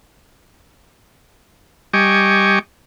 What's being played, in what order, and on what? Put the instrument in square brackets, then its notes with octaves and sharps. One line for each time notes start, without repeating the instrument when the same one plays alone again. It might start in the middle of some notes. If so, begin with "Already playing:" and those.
[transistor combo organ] G3 G4 D#5 G#5 C#6 D6